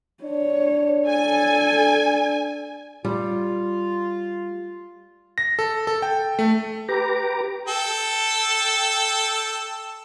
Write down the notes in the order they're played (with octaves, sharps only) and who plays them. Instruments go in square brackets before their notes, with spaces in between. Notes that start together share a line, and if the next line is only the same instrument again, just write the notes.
[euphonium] D4 [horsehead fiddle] C#5
[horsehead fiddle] A4 [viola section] G#5
[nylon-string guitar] G3 [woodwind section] F4
[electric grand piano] A#6
A4
A4
G5
A3
[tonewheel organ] G4 B4 A#5 D6
[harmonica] A4 G5